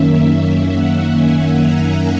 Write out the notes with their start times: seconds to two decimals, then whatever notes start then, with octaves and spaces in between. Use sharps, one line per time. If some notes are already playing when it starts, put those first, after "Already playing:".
Already playing: F#2 D#3 A#3 C#4 E5
0.71 F#5
1.16 G#5
1.61 A#5